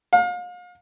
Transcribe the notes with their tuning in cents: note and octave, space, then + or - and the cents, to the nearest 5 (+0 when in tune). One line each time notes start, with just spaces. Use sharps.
F5 +35